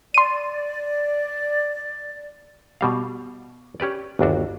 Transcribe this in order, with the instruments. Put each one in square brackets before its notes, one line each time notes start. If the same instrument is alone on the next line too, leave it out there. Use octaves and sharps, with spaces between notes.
[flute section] D5 [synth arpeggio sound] C6 D#7
[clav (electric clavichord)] B2 G3 F5
C#4 G4 B4 D5
G1 D#2 D4 F#4